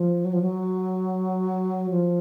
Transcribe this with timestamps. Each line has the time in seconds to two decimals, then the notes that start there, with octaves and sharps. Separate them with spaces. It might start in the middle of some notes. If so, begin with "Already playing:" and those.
Already playing: F3
0.25 F#3
0.33 F3
0.42 F#3
1.90 F3